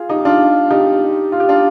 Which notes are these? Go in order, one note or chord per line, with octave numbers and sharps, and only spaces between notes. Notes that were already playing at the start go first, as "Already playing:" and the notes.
Already playing: F4 G#4
D#4 G4
D4 F4
D#4 G4
F4
G4
D4 F4